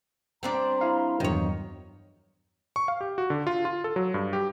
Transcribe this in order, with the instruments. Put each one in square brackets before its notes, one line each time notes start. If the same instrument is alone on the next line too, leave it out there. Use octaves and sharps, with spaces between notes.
[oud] G3 C4 D4 [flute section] A#5 C6
[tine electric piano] E4 F5
[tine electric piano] E2 G2 F#3 [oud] D#3 C#5
[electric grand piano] C#6
F5
G4
F#4
D3
F4
F4
A4
F#3
G2
G4